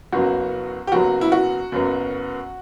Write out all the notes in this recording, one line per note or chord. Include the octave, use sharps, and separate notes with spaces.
F#1 F#2 F#3 B3 F#4
G4
F#1 F#2 F#3 B3 F#4
E4
F#4
F#1 F#2 F#3 B3